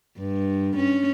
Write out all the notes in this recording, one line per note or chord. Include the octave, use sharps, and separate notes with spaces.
G2
C#4